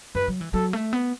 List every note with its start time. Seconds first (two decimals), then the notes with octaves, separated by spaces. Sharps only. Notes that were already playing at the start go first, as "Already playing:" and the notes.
0.15 F#2 B4
0.28 F#3
0.41 E3
0.54 F#3 A4
0.73 A3
0.93 B3